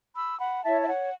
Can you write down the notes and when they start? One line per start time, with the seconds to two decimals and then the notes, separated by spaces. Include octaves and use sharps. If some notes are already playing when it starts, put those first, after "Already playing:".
0.15 B5 E6
0.39 F#5 B5
0.63 E4 C#5 E5 A5
0.81 E5
0.88 C#5 F#5